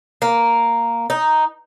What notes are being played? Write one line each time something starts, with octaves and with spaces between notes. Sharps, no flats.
A#3
D#4